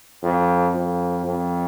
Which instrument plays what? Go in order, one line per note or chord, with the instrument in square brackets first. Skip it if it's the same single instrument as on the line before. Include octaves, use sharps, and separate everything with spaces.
[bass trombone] F2
F2
F2